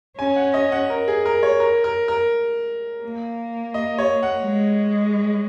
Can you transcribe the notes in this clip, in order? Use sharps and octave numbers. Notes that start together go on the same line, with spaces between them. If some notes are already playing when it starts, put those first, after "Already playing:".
C#4 G#5
F#5
D#5
F#5
A#4
G#4
A#4
C#5
A#4
A#4
A#4
A#3
D#5
C#5
F#5
G#3